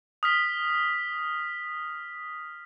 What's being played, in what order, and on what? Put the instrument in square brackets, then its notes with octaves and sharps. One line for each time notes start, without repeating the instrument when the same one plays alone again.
[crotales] D#6 F6 B6